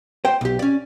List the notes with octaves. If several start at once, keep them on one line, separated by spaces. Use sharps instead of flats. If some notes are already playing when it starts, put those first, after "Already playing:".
C5 G5
B1 G4
C#4 D5